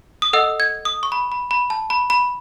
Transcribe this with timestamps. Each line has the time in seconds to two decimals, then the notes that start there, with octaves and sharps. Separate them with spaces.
0.22 D#6
0.33 A4 D#5 F#5 E6
0.60 G#6
0.85 D#6
1.03 C#6
1.12 B5
1.32 B5
1.51 B5
1.70 A5
1.90 B5
2.10 B5